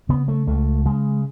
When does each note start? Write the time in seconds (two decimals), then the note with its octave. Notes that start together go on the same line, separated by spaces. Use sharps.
0.09 C#3 B3
0.28 A3
0.47 C#2 A3
0.86 C#3 G#3